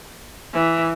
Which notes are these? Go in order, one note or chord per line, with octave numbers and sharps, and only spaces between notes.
E3